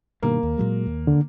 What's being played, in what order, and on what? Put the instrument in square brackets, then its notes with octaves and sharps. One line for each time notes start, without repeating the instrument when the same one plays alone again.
[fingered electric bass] G2 B2 D#3 [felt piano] A#3
[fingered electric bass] D#2
A#2 F#3 G#3
D#2
[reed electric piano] D3